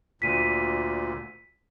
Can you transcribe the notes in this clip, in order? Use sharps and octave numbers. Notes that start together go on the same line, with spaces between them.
D2 A#2 B6 D#7